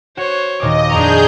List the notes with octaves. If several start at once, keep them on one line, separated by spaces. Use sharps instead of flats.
F#4 C5 C#5
D#2 A#2 D#5 D6
F2 D4 G#4 A#5 C#6 G6